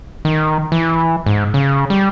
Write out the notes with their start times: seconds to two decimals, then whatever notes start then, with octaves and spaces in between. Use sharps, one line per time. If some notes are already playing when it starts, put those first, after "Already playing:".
0.25 D#3
0.72 E3
1.26 G#2
1.54 C#3
1.90 G3